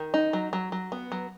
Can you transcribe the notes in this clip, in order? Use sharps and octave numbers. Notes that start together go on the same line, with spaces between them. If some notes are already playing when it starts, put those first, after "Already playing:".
Already playing: D#3
D#4
F#3
F#3
F#3
B3
F#3